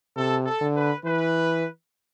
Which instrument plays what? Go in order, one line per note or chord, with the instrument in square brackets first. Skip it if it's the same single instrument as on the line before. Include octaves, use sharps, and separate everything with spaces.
[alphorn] C3 [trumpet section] A4
[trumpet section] A4
[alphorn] D3
[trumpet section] B4
[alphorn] E3 [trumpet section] B4